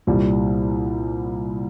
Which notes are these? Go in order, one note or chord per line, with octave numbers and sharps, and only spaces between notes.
C2 A#2 G3